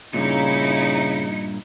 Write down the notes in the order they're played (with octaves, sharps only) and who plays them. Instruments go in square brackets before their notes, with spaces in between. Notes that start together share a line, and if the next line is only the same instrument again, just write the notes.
[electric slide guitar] G2 A#2 [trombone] C#3 [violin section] D#4 E4 C#7